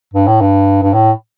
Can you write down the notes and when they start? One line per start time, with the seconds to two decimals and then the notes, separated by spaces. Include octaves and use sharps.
0.14 G2
0.27 A2
0.41 G2
0.82 G2
0.93 A2